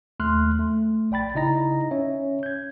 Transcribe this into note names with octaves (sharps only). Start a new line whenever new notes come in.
D#2 A3 C6 F6 F#6
A3
A#1 D5 G5 B5 A6
C#3 D#4 E4 D#5 A#5 A#6
C#4 C#5 E5
G6 G#6